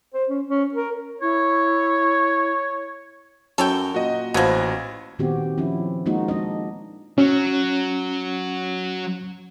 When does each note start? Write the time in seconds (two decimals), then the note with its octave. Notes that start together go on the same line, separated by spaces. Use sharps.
0.14 C5
0.29 C#4
0.47 C#4
0.74 A#4
1.21 E4 C#5
3.58 F#2 A4 C#5 G5
3.94 A#2 F#4 D#5
4.34 A1 F3 B3 F#4 G#6
5.19 A#2 D#3 B3 C4 F#4 G4
5.58 F3 C4 C#4 E4
6.06 G#3 A#3 D#4 F4 F#4
6.28 D4 D#5
7.18 F#3 C#4